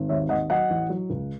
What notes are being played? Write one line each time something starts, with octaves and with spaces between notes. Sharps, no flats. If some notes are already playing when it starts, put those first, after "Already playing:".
Already playing: G#1
D#2 C#5 E5
D#2 D#5 F#5
F#3 D#5 F#5
A1
F#3
C#2